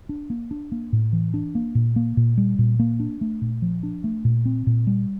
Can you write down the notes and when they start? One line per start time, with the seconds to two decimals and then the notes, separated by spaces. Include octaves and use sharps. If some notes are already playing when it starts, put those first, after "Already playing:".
0.09 D4
0.30 A#3
0.51 D4
0.72 A#3
0.93 A2
1.13 E3
1.34 D4
1.55 A#3
1.75 A#2
1.96 A#3
2.17 A#2
2.38 G3
2.59 A#2
2.79 A#3
3.00 D4
3.21 A3
3.42 A#2
3.62 F3
3.83 D4
4.04 A3
4.25 A#2
4.45 C4
4.67 A#2
4.87 G3